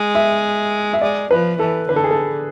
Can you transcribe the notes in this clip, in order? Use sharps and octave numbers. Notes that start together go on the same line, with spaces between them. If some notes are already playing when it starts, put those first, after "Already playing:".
Already playing: G#3
E5
E5
G#3 D5
F3 B4
E3 A4
D3 B4
A4
G#4
A4